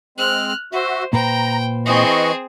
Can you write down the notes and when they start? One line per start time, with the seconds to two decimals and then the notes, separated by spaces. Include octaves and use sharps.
0.18 G#3 C4 F6 F#6
0.72 F#4 C5 E5
1.13 A#2 B4 C5 G5 A#5
1.86 E3 C4 G#4 D#5 C#6